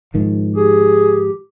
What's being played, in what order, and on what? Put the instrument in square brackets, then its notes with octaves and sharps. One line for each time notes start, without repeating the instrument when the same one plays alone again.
[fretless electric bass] G#2 D#3 F3
[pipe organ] G4 [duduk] G#4